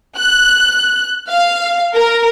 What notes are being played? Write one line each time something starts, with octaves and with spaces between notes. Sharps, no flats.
F#6
F5
A#4